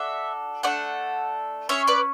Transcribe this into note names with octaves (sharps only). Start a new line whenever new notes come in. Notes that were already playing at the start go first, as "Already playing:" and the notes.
Already playing: D4 F#4 A4 E5
A3 D4 A4 D5 F#5
C#4 E4 G#4 C#5 E5
B4 D5